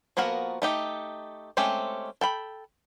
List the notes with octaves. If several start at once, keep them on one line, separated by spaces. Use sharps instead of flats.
F3 A#3 B3 F#4 A#4
A3 D#4 G4
G#3 A3 C4 C#4 G4
A4 G5 B5